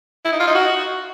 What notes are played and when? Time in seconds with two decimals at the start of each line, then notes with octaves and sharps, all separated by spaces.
0.25 E4
0.32 D#4
0.40 F4
0.47 D#4
0.55 F#4